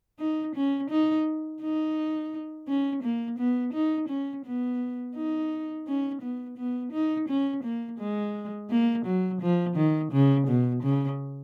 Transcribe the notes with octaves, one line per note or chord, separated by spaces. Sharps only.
D#4
C#4
D#4
D#4
C#4
A#3
B3
D#4
C#4
B3
D#4
C#4
B3
B3
D#4
C#4
A#3
G#3
A#3
F#3
F3
D#3
C#3
B2
C#3